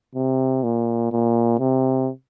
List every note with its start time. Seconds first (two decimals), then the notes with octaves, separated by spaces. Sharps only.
0.15 C3
0.64 A#2
1.12 A#2
1.59 C3